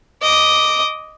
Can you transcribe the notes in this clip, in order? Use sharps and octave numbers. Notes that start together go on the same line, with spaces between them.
D#5 D6